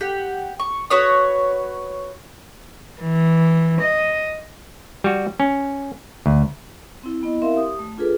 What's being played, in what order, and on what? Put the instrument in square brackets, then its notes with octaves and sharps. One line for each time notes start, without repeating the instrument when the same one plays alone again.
[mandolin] G4 F#5
C#6
F#4 B4 C#5 D#6
[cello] E3
D#5
[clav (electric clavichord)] G3 F#4
C#4
D2
[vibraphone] C4 E4
B3 E4 D#5
C4 E4 A#4 E5 F5 C6
G4 D#6
A3
D4 F4 G#4 A4 B4